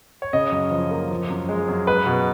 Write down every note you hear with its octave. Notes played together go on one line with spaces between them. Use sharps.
C#5
C#3 D#5
F#2
F3
A#3
F3
F#2
G#3
F#2
G#3 B4
B2